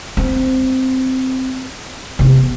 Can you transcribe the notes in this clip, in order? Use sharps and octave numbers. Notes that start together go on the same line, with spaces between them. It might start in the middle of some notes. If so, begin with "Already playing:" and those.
C4
C3 B3